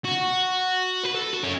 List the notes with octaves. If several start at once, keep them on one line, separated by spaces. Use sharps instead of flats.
F#4
B4
A4
F#4
C#4